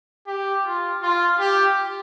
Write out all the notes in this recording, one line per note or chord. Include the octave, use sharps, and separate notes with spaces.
G4
F4
F4
G4